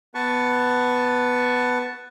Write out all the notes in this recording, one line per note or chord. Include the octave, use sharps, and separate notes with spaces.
B3 B4 A5 C#6